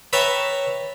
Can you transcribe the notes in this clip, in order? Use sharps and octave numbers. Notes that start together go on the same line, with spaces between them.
B4 C#5 E5 G5 A5 A#5